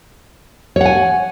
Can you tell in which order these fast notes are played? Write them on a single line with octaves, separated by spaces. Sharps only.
C#5 F#5 G#5